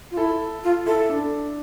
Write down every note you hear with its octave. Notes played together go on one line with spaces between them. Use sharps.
F4
E4 A4
F4
E4 A4
D4